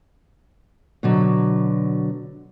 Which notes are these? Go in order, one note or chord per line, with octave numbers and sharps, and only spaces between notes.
B2 D3 F#3